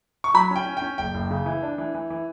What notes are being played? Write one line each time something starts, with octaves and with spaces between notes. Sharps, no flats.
C#6
F#3 B5
C#4 G5
C#4
G5
C#4
F#1 G5
F#1
C#3
E3
D4
E3
E3
E3